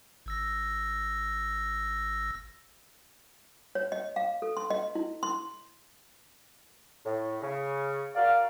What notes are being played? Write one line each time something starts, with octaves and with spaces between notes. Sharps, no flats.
G#1 E6 A#6
C#5
D#5
F5
A4
C6
D#5
E4
C6
A2
C#3
F#4 A#4 D5 F5